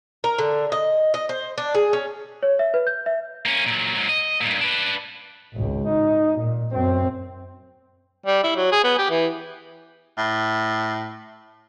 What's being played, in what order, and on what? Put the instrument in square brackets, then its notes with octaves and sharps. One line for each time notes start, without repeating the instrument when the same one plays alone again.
[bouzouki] A#4
D3
D#5
D#5
C5
D4
G#4
C#4
[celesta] C#5
E5
B4
G6
E5
[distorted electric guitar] A#3 C#4
A#2 F#3
G#2 F#3
D#5
G2 A#2
D4 B4
[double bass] G#1 C#2
D#4
A#2
F#2 C4
[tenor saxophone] G3
E4
F#3
G#4
B3
G4
E3
[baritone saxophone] A2